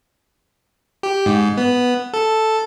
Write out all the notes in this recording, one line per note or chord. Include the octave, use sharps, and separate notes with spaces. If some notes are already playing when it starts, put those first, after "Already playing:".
G4
G#2
B3
A4